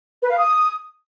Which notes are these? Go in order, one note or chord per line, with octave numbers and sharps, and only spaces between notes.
B4
F5
D#6